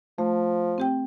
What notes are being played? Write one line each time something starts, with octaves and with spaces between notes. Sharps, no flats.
F3 A3
C4 G4 G5